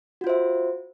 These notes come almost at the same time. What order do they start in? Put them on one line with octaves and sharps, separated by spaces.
F#4 F4 C5 E5